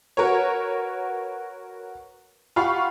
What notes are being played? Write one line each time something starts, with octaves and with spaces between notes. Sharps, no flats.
F#4 A#4 B4 C#5
F4 G4 F5 F#5 B5 C#6